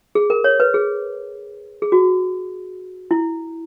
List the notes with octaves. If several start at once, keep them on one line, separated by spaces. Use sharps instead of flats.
G#4
A#4
C#5
B4
G#4
G#4
F#4
E4